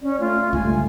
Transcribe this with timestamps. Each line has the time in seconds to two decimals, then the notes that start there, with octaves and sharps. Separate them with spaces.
0.02 C#4 D5
0.20 A3 F4
0.53 C#2 G2 G#5